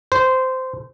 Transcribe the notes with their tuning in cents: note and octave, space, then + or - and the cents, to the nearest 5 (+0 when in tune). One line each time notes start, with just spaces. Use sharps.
C5 -15